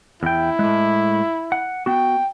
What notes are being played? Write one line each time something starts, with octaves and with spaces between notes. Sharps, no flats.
E2 E4 G5
A2 G#3
F#5
B3 F#4 G5